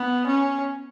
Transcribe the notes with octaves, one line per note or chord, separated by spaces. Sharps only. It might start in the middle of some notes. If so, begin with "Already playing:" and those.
Already playing: B3
C#4